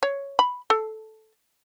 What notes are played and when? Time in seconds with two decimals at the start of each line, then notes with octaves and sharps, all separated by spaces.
0.03 C#5
0.39 B5
0.70 A4